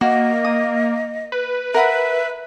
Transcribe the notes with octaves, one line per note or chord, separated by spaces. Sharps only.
A#3 F#4 D#5
D#6
B4
A#4 E5 F#5 B5